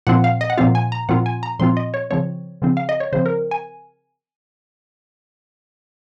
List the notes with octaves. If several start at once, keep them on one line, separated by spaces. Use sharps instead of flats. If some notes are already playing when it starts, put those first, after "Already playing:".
A#2 F3 C4 F4 F#5
F5
D#5
F#5
A#2 F3 C4 F4 F5
G#5
A#5
A#2 F3 C4 F4 F#5
G#5
A#5
A#2 F3 C4 F4 C6
D#5
C#5
C#3 F3 C4 C#5
C#3 F3 C4
F5
D#5
C#5
C#3 F3 C4 C5
A#4
G#5